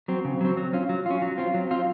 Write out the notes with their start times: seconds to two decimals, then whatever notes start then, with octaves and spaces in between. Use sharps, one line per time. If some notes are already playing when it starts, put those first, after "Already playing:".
0.08 F#3 C4
0.25 C#3
0.41 F#3 C4
0.57 F#3
0.73 C#4 F4
0.89 F#3
1.06 C#4 F4
1.22 F#3
1.38 C4 F4
1.54 F#3
1.71 C4 F4